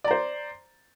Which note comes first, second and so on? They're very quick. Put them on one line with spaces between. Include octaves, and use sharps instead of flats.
D5 A#5 C5